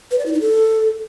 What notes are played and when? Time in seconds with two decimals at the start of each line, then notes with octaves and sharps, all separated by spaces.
0.11 B4
0.19 D5
0.26 E4
0.33 D#4
0.41 A4